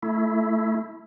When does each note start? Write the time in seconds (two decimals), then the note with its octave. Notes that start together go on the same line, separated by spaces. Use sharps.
0.03 A3 E4